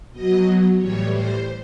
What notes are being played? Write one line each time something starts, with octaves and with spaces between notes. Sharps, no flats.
B2 F#3 D#5
A2 E3 G3 C#5
C5